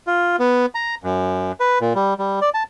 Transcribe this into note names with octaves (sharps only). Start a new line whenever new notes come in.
F4
B3
A#5
F#2
B4
A#2
G3
G3
D5
A5